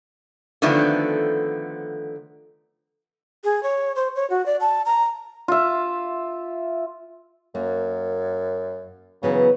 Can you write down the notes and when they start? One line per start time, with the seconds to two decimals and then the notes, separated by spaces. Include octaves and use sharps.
0.62 D3 D#3 F3 A3 B3 C4
3.44 G#4
3.63 C#5
3.96 C5
4.15 C#5
4.30 F#4
4.46 D5
4.60 A5
4.86 A#5
5.48 F4 E5
7.55 F#2 A#3
9.23 C#3 E3 F#3 B3